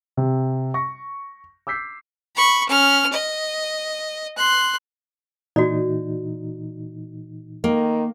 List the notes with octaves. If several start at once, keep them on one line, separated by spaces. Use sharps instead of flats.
C3
C#6 A#6
D6 E6 G6 B6 C7
B5 C#6
C#4 F6
D#5
C6 F#6
A#2 E3 D#4 F#4 D5
D#3 A#3